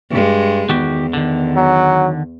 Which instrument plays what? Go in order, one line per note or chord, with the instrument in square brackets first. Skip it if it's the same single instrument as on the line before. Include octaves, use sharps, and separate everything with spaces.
[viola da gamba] G2 G#3
[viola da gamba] E2 [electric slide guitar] D#3 F#4 G4
[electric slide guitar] D3 D#3
[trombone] F#3